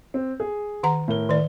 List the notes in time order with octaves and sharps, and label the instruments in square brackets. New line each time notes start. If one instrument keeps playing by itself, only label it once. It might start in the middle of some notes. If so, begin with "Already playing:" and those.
[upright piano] C4
G#4
[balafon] D#3 F#5 A#5
[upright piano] A2 A#4 G7
[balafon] D#3 D5